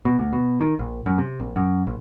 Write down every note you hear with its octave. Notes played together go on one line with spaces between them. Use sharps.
B2
D2
B2
D#3
A#1
F#2
C3
A#1
F#2
A#1